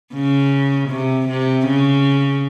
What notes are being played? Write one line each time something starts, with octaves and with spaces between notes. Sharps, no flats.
C#3
C3
C3
C#3